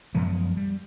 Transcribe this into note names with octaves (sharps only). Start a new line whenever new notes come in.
F#2 F3 G#3 B3
G3